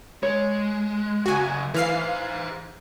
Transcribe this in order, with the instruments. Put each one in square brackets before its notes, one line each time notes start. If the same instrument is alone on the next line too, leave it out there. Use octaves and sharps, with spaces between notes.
[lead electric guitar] G#3 [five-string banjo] C#5
[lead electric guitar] F#2 C#3 [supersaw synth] F#4 G#5
[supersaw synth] E3 F5 C7 [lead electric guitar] G#4 C5